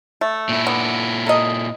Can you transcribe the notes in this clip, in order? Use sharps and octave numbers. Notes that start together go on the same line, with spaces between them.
A3
A#2 E4
D3 B3
A4 A#4 D#5